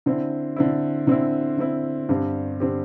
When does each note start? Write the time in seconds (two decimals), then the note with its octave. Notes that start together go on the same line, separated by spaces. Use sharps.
0.06 D3 C4 E4
0.56 D3 C4 E4
1.07 D3 C4 E4
1.58 D3 C4 E4
2.09 G2 D3 C4 G4
2.60 D3 C4 G4